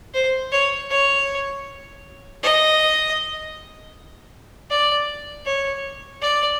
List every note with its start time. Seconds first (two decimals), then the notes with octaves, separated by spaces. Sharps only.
0.14 C5
0.52 C#5
0.90 C#5
2.43 D#5
4.70 D5
5.45 C#5
6.21 D5